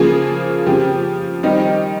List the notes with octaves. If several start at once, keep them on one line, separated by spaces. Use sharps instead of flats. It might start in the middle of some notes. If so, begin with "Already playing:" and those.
Already playing: C#3 F3 A#3 F4 G#4
C#3 F3 C4 G4
D#3 G3 C4 D#4 G4